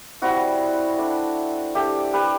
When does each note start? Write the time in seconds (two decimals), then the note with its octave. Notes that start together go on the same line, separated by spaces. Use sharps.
0.22 G3 C4 E4 F#4
0.98 A3 D4
1.75 A3 D4 G4
2.13 G4 B4